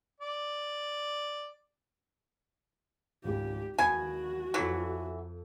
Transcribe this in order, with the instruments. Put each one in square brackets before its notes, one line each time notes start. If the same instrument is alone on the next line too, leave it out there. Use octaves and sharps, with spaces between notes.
[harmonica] D5
[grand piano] G#1 C#2 [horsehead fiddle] G4
[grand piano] D#2 G#3 [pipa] B2 G#5 [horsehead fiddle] F#4
[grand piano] F2 A4 [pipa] E3 F#3